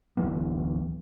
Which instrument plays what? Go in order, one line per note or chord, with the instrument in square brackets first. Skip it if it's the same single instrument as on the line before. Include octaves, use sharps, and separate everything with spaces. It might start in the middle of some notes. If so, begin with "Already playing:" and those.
[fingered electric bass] D1 E3 F#3 B3